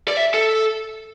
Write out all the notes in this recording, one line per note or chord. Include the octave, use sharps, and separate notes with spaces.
D5
E5
A4